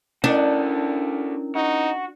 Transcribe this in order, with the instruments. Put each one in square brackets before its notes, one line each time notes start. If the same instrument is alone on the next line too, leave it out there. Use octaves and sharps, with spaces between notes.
[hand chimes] C#4 E4 A#4 [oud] D4 [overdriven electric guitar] F#4 A4
[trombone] D#4 [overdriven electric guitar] F#4